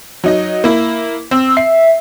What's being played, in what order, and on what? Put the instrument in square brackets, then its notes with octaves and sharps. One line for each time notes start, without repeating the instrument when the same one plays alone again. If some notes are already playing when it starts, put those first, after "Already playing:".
[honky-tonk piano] F#3 D#4 D#5
A#3 E4
[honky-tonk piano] C4 [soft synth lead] E6
[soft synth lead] E5 [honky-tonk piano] C7